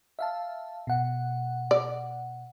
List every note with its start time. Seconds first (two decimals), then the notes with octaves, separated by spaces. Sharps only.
0.19 E5 F5 A5
0.87 B2 F#5
1.71 D5